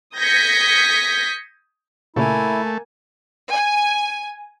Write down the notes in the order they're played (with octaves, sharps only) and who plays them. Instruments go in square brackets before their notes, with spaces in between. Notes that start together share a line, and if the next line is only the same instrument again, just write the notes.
[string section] D#6 G6 G#6 A#6 B6 C#7
[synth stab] A#2 C#3 [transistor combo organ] A3 [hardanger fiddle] A#3 G#5 [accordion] E4
[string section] G#5